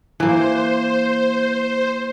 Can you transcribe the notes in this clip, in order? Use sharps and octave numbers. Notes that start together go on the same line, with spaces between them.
E3 A#3 C5